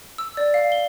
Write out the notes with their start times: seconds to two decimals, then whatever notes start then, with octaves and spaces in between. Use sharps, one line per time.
0.18 E6
0.37 D5
0.54 F5
0.72 G7